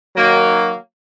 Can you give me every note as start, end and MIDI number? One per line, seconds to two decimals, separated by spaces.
0.16 0.74 51
0.16 0.74 54
0.16 0.74 58